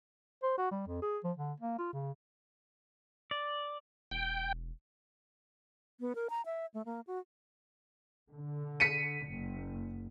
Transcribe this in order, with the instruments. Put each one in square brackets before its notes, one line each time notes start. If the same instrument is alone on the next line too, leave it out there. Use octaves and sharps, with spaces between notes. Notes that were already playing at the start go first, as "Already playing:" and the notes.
[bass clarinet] C5
F#4
G3
F2
G#4
F3
D3
A#3
F4
C#3
[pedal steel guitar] D5
[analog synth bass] E1 [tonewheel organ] G5
[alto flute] B3
A#4
A#5
E5
A3
A#3
F#4
[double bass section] D3
[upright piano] B6 C#7 D#7
[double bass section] F#1